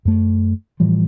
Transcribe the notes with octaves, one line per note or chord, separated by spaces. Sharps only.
F#2 A3
A2 E3 F3 G3